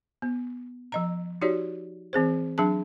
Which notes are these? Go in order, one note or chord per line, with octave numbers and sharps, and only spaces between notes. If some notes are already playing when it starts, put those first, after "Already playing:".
B3
F3 D#5 A#5
D#4 F#4 G4 C#5 D5
E3 C4 G#4 C5
F#3 D4 G#4 A5